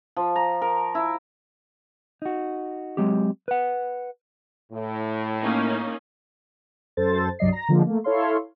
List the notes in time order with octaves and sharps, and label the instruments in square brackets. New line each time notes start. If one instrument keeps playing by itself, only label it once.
[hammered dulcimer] F3
A#5
A#4
E4
[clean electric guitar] D#4 F#4
F#3 G#3 C4 G4
B4 F#5
[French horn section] A2
[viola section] A#3 C#4 D#4
[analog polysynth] F#2 A4 C5 A6
C2 G2 F#3 D5 D#5 C7
A#5 A#6
D3 F3 G#3 A#3
A3 A#3
E4 A4 C#5 F5 C6